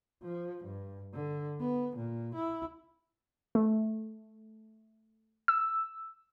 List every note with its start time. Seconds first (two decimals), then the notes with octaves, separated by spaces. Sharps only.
0.23 F3
0.65 G2
1.14 D3
1.61 B3
1.97 A#2
2.35 E4
3.55 A3
5.48 E6